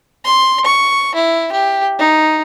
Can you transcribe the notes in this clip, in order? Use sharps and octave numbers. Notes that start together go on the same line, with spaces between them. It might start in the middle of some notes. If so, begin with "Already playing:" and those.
C6
C#6
E4
G4
D#4